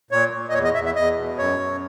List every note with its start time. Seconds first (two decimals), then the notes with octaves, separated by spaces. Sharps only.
0.11 A#2 C#5
0.33 A#2
0.49 D#5
0.54 E2 C#5
0.65 D#5
0.75 E2 E5
0.85 E5
0.96 E2 D#5
1.18 B2
1.38 F#2 C#5
1.59 F#2